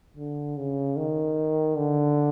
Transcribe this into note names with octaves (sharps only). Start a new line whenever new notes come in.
D3
C#3
D#3
D3